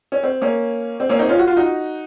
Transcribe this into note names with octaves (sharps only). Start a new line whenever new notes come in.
C#4
C4
A#3 C#4
C4
A#3 C#4
C4 D#4
C#4 F4
F#4
F4
D#4 F#4